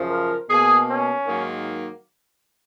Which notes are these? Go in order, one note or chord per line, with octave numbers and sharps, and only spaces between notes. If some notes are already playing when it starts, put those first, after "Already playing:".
Already playing: F#2 C#3 F3
A#4
B2 A#3 G#4
C#4
G#2 D#3 F#3 A#3